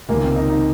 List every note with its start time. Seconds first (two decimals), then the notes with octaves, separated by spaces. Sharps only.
0.09 C#2 C3 D#3 A#3
0.22 C4
0.36 D#4
0.50 D#4